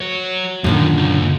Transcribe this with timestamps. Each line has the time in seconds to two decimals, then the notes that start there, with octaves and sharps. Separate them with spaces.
0.01 F#4 C#5
0.64 B1 F#2 A#2 D3 D#3
0.97 C#2